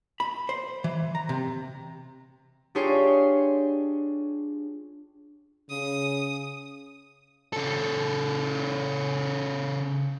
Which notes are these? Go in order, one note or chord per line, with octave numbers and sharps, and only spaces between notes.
B5
C5
E3
A#5
C3
D4 F4 G4 G#4 C#5 G5
C#3 D#6
C#3 A4